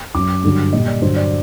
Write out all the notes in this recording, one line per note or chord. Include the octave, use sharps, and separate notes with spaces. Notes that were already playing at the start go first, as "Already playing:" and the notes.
F#2 F#3 D6
G2 D3 F#3
A#2 G3 D#5
D5
G2 D3 F#3 C5
D5